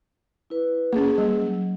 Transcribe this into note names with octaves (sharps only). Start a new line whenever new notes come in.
E4 B4
A#3 C#4 G#4
G3
F#3